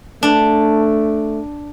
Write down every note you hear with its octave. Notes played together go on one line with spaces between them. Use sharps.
A3 D4